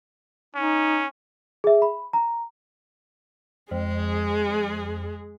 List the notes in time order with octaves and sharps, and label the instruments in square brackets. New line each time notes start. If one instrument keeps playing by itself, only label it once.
[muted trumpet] C#4 [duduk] D#4
[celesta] G#4 E5
B5
A#5
[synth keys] F2 [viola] G#3 G#4